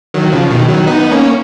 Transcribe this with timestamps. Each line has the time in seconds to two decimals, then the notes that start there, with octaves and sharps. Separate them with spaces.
0.14 D#3 F#3
0.32 C#3 F3
0.50 B2 D#3
0.69 D#3 F#3
0.87 B3 D#4
1.00 B3
1.11 A#3 C#4